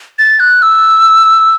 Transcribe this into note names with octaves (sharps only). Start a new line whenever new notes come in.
A6
F#6
E6